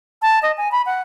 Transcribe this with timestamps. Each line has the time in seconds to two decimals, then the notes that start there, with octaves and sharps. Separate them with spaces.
0.22 A5
0.43 D#5
0.57 G#5
0.72 B5
0.86 F#5